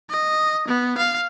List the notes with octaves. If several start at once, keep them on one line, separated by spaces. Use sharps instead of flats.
D#5
B3
F5